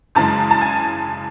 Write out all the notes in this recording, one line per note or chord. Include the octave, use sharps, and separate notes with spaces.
F#2 C#3 E3 G#3 A5
A5
G#5